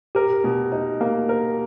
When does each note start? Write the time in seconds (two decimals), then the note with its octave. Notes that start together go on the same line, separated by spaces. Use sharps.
0.15 G4 A#4
0.44 B2
0.72 D#4
1.01 A#3
1.29 A#4